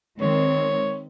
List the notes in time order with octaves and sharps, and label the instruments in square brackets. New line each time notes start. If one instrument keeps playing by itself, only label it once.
[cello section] D#3 G#3 C4 [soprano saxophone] C#5